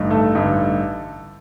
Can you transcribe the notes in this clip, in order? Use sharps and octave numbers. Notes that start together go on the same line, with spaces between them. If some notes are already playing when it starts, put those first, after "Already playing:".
Already playing: A1 G2 D3 D#4
A3 A4
A1 G2 D3 A3 D#4